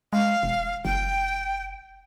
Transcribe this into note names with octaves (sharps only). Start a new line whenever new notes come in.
G#3 F5
E1
F#1 G5